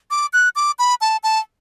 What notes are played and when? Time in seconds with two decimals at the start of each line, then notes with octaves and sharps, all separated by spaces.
0.11 D6
0.33 F#6
0.56 D6
0.79 B5
1.01 A5
1.23 A5